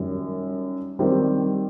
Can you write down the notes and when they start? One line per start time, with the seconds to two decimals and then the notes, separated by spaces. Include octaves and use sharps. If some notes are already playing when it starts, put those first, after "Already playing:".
Already playing: F#2 D#3 G3
0.99 D#3 G3 C4